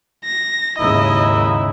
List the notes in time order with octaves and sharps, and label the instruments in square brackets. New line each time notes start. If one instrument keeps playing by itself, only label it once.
[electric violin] A#6
[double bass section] D#2 G#2 C#3 [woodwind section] D#4 E4 [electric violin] D#5